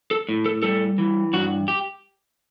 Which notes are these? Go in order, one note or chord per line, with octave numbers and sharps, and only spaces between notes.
A4
A2
A4
G3 A4
E3
G2 F#4
G4